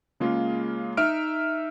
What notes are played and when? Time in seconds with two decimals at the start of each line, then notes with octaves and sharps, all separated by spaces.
0.20 C#3 G#3 A#3 F4
0.97 D#4 E5 F6 D7